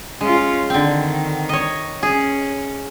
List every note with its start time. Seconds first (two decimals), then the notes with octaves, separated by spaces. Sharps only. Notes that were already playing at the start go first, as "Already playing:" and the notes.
0.21 G#3 C#4 F4
0.70 D3 D#3 C4
1.49 C#5 D#5
2.03 C#4 G#4